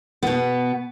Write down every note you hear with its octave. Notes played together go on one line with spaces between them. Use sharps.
B2 B3